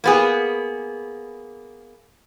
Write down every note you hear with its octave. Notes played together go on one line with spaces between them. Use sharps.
A#3 B3 G#4